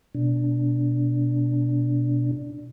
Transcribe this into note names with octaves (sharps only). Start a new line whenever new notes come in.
B2 D4